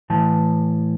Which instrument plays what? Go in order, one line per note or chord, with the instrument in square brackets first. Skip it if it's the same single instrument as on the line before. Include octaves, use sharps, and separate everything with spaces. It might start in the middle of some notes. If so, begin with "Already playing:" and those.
[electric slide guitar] A2 E3 A5